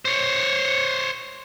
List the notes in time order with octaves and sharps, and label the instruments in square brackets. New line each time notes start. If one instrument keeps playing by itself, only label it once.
[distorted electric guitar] C5 C#5